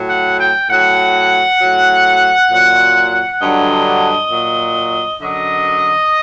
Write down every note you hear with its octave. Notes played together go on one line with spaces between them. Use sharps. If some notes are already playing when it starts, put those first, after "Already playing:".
Already playing: A2 F#3
F#5
G5
A2 F#3 F#5
A2 F#3
A#2 F#3
G2 D3 F#3 D#5
A#2 F#3
F#2 D3 F#3 D#5